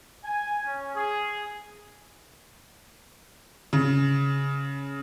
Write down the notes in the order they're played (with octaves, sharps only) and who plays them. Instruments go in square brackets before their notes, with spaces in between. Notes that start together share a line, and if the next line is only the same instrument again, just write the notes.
[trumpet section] G#5
C#4
G#4
[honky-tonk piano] C#3